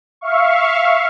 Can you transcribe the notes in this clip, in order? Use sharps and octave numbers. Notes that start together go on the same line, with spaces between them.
E5 F5 C#6